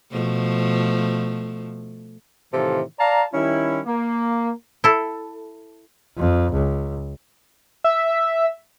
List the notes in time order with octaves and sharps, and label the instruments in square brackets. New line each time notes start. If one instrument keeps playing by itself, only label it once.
[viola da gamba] B2 F3 A3
[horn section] A2 C3 D#3 E3 F4 A4
D5 F5 A5 A#5
D#3 G3 C#4 E4
A#3
[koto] E4 A4
[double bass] F2
C#2
[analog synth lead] E5